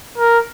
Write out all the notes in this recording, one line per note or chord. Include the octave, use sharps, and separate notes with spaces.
A#4